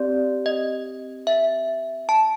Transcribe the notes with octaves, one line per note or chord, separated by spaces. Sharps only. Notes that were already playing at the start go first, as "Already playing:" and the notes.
Already playing: C4 G4 D5
D#5
E5
A5